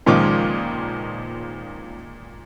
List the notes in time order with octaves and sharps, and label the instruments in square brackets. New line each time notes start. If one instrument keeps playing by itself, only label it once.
[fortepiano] C#2 F3 D6 [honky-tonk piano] A#2 D#3 G#3